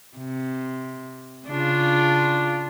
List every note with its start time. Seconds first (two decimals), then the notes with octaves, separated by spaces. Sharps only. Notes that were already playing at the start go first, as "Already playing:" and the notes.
0.17 C3
1.48 C#3 D4 F4